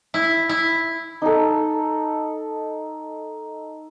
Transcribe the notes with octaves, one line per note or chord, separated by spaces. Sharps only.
E4
E4
D#4 A4